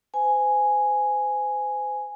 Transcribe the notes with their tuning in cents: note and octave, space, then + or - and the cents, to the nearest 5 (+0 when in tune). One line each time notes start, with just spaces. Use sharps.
C5 -40 G#5 +0